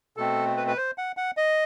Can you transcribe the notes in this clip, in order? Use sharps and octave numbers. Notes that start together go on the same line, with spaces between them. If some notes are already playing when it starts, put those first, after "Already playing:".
B2 A3 C4 A4
B4
B4
C5
F#5
F#5
D#5